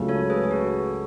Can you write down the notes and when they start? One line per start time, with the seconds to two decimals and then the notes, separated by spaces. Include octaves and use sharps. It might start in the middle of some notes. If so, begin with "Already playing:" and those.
Already playing: C#2 C#3 F#3 A3
0.09 A4 C#5
0.30 G#4 B4
0.44 G#4
0.51 F#4 A4